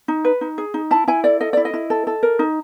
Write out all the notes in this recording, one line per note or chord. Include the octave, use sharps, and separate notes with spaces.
D#4
B4
D#4
G#4
D#4
E4 A5
E4 G#5
A4 D5
A4 D#5
E4 D5
D#5
E4
A4
A4
A#4
D#4